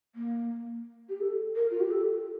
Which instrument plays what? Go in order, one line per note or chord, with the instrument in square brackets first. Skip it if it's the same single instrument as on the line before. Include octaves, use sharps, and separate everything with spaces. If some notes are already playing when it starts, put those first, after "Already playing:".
[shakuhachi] A#3
G4
A4
A#4
F4
G4
A4